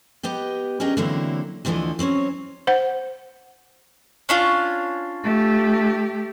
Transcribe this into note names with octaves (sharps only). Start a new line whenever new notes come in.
B3 G4 B4 D#5 G5
C#4 D4 G#4 A#4 D#5 G5
D3 E3 F#3 A#3 C4 E4
D2 A2 D3 E3 F3 D#5
F#3 C4 C#4 C#5
C5 F#5
C#4 D4 F4
A3 G4